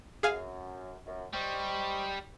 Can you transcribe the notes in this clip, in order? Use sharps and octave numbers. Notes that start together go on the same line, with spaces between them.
F#2 G#4 F5 G#5
F#2
G3 C5 D#5 C#6